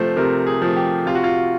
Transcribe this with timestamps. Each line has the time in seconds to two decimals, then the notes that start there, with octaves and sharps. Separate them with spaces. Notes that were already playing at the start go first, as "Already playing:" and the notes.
Already playing: C3 F3 A3 C5
0.17 C3 A#4
0.47 G#4
0.62 F3 A3
0.76 G4
1.06 C3 F4
1.15 F#4
1.24 F4